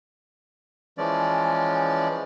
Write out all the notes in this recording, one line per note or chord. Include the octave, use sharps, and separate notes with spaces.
E3 F3 G#3 C#4 D5